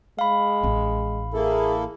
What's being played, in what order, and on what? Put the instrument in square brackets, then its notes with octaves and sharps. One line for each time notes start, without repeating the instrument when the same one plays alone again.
[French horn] G#3 [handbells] F5 B5
[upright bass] A1 C#4
[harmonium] A#3 E4 A4 [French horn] G#4